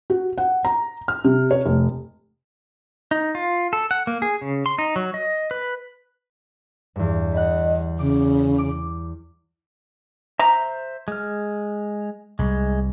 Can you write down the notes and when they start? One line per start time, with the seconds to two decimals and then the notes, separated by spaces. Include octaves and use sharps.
0.10 F#4
0.38 F#5
0.65 A#5
1.08 F6
1.25 C3
1.51 C#5
1.66 F1
3.11 D#4
3.35 F4
3.73 A4
3.91 F#5
4.07 A#3
4.22 G#4
4.42 C#3
4.66 C6
4.78 D#4
4.96 F#3
5.14 D#5
5.51 B4
6.96 E2 G2
7.33 D#5 F#5 B5
7.99 C#3 D6
8.58 D6
10.39 C5 E5 A#5
11.08 G#3 F6
12.39 C2 C3 G#3